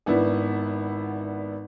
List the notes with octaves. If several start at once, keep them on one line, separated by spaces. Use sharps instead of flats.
G#1 B3 D4 E4